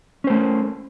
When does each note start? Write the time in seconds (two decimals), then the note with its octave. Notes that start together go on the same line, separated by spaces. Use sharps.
0.24 C#4
0.27 C5
0.30 A3